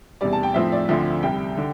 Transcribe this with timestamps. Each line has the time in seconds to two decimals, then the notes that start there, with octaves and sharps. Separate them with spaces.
0.21 E2 C3 G3 D5
0.33 A5
0.43 G5
0.54 A2 F3 C4 E5
0.72 D5
0.89 D2 D3 F3 C4 E5
1.23 C2 C3 G3 G5
1.57 D3